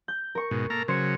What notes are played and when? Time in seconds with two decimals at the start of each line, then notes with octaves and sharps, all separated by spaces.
0.08 G6
0.35 A#4 C#6
0.51 G#2 B2
0.70 A#3 A4 A#5
0.88 C#3 F#3 C5 C#7